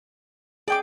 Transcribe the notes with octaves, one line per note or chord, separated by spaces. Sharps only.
G#4 D5 G5 D6